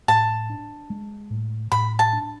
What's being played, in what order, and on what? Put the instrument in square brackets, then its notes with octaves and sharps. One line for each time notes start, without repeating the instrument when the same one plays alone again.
[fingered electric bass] A2 [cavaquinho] A5
[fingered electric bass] D4
G#3
A2
[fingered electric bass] A2 [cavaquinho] B5
[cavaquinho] A5
[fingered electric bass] D4